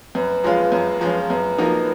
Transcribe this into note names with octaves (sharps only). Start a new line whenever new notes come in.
F#2 B4
F3 G#3 C#4 F4
F#2
F3 G#3 C#4 F4
F#2 B4
F3 A#3 D#4 F#4